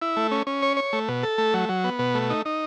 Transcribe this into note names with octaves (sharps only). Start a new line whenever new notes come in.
E4
A3
C#4
C#4
C#5
C#5
A3
B2
A4
A3
F#3
F#3
B3
B2
A3
D#4
D#4